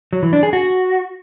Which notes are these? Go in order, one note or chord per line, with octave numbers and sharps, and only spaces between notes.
F#3
E3
D4
G#4
F#4